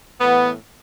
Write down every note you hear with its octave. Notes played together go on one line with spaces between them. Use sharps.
A2 E3 B3